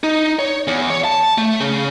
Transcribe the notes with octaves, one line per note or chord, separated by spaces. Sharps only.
D#4
C#5
E2
C#5
A5
A3
C#3